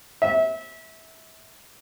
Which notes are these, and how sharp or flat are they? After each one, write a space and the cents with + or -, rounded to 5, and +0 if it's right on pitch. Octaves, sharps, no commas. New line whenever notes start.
E5 -25